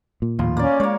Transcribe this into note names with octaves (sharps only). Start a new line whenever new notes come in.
A#2
D#2 A2 F3 F4
A#3 C#4 D5
G#3 A#3 C#5